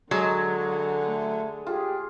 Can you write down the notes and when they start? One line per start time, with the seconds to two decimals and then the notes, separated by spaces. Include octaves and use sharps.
0.11 D3 F#3 G#3
1.07 A3
1.67 F4 G4 G#4